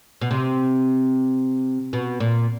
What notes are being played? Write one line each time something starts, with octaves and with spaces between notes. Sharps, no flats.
B2
C3
B2
A#2